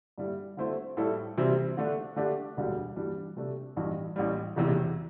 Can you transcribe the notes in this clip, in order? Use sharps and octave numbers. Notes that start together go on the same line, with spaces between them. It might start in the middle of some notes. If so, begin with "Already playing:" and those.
G2 D3 G3 E4
D3 A3 C4 E4 C5
A2 G3 E4 A4
C3 E3 G3 C4 E4
D3 A3 D4
D3 A3 D4 G4
E1 D2 D3 G3
G2 E3 G3 D4
C3 A3 D4 A4
A1 G2 E3
A1 A2 G3
E1 E2 C3 E3